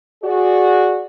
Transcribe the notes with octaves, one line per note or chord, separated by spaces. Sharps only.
F#4 G#4 D5